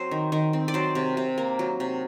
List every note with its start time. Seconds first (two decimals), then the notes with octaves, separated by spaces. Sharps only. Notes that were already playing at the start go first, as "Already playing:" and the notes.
Already playing: F#3 C4 C5
0.11 D#3
0.32 D#3
0.53 C4
0.68 D5
0.74 F#3 C5
0.95 C3
1.17 C3
1.38 A#3
1.59 F#3
1.80 C3